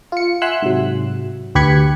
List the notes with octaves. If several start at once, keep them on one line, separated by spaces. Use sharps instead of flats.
F4 C#7
E5 F#5 G#5 C6 E6 F#6
G#2 C3 F#3
D2 G4 B4 B5 G#6 C#7